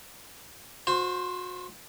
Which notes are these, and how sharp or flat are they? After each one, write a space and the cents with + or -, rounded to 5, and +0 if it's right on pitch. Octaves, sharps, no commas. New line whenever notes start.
F#4 -35 C5 +0